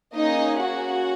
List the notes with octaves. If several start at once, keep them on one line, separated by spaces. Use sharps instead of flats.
A#3 C#4 D#4 G#4 D#5
F#4 F#5